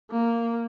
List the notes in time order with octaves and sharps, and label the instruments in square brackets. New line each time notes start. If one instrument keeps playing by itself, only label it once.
[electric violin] A#3